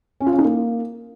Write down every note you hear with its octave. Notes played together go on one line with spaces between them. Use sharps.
C#4
F4
C#4
D#4
A#3